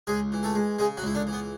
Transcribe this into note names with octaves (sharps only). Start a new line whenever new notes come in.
C#2 G#3 G#4
E3
A3 A4
G#3
C#3 G#3 G#4
F#3 F#4
C#2 E4
D3 D4
E3
B3